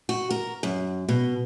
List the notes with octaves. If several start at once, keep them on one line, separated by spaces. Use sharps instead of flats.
F#4
A#4
F#2
B2